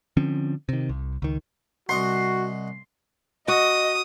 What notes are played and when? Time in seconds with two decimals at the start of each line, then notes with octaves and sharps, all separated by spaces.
0.17 D3 F3 C4 C#4
0.69 C3 D#3
0.89 C2
1.22 C#2 D#3
1.89 C2 F#4 D#5 F#5 C6
3.48 F#4 D#5 D#6